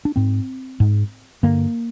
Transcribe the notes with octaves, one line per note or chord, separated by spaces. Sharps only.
D4
G#2 C4
G#2
G2 D3 A#3